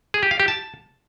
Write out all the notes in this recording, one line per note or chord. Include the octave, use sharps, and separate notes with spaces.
G#4
G4
F5
G4
A5